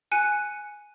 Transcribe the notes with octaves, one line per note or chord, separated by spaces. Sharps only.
G#5 F#6 C#7 D#7